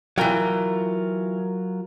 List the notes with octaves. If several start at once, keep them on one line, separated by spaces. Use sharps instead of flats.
E3 F#3 F4 A#4 G5